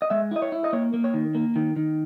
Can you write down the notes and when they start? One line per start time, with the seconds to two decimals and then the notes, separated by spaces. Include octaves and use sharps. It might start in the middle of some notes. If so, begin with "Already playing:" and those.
0.02 D#5
0.10 G#3 E5
0.31 E4 D#5
0.42 C#5
0.52 E4
0.64 D#5
0.73 A#3 C#5
0.94 A#3
1.04 C#5
1.14 D#3
1.35 A#3
1.56 D#3
1.76 D#3